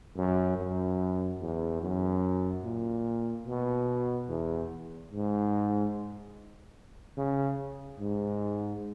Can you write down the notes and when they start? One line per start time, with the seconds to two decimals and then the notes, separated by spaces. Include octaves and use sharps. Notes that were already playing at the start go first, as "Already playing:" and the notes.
0.16 F#2
0.58 F#2
1.40 E2
1.81 F#2
2.64 A#2
3.46 B2
4.28 E2
5.11 G#2
7.17 C#3
8.00 G#2